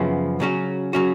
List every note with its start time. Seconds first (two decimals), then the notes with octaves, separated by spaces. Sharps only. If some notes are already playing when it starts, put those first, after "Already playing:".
Already playing: F#2 C#3 F3 B3
0.40 C#3 F#3 C#4 F#4
0.93 C#3 F#3 C#4 F#4